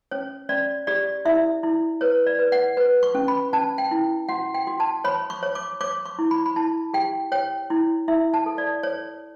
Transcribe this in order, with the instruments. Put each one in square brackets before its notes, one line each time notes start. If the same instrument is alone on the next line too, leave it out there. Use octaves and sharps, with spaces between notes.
[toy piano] C#4 C#5
C#4 D5
G4 D5
E4 E5
E4
B4 C#5
D5
B4
F#5
B4
C#6
C#4
B5
C#4 A5
G5
E4
F#4 F#5
G5
F#4
A5
C#5 B5
C#6
C#5
D6
C#5 D6
C#6
E4
B5
B5
E4 A5
G4 G5
C#5 G5
E4
E4 E5
A5
A4
D5
C#5